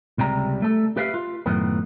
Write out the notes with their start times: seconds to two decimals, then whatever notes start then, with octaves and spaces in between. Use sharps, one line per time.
0.18 C#2 C3 G3 A#5
0.62 A3 A4
0.97 G4 B4 E5 F5
1.14 F4
1.46 F#2 A2 D#3 B3